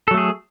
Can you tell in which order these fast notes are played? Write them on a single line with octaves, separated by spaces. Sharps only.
A4 F#3 A3 G#4